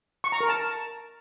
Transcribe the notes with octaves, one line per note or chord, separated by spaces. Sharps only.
C#6
A#5
A#4
A5